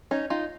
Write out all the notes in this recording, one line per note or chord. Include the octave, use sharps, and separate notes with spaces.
C#4 D#4
D#4 F4